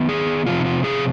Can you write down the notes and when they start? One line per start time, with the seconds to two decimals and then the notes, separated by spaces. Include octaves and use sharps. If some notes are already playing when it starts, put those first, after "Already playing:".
Already playing: D#3 B3
0.09 G#4
0.47 C3 F3 C4 F4
0.60 D#4
0.65 F4
0.84 G#4